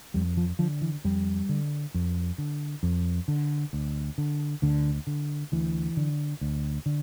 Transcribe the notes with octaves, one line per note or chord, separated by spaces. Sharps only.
F2 G3
F3
D3 F3
E3
F2 G3
D3
F2
D3
F2
D3
D2
D3
D2 D3
D3
D2 E3
D3
D2
D3